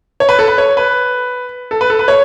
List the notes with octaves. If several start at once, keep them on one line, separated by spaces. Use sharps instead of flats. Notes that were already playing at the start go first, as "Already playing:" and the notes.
C#5
B4
A4
B4
C#5
B4
A4
B4
A4
B4
C#5